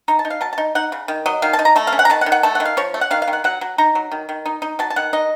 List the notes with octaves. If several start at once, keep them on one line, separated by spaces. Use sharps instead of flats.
D#4 A#5
A5
D#4
F5
F#3 A5
A5
D#4
D#4 F#5
C#3
D#3
F#3 D#5
D#3 F5
A5
D#4
A#5
A3 A5
F5
C#4
F#5
A#5
D#3 A5
F#5
D#3
F#5
A3 A5
D#3 F#5
F5
F3 C#5
A3
F#5
D#3 F5
F5
D#3
F#5
F#3 F#5
F#3
D#4 A#5
F#3
D#3
D#3
D#4
D#4
F#3 A5
A5
D#3 F#5
D#4 D#5